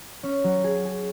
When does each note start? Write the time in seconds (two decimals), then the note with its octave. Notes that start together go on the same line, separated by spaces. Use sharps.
0.23 C#4
0.44 F#3
0.64 G#4
0.85 G#4